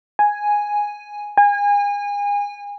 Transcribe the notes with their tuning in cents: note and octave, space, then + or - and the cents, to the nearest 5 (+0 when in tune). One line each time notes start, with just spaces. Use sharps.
G#5 +0
G#5 -30